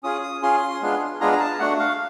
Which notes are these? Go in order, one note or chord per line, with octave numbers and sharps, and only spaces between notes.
C#4 F4 G#4 D#6
D#6
C#4 F4 G#4 C6
G#3 B3 D4 F4 G#4
G#3 B3 D4 F4 G#4 A#5
A#5
A5
A3 D4 F#4 F#5
F5